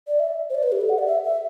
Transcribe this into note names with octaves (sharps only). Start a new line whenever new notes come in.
D5
E5
C5
D5
B4
G4
A4
F#5
D5
E5
E5